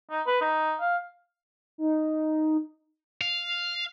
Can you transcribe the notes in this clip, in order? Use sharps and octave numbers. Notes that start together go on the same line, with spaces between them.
D#4
B4
D#4
F5
D#4
F5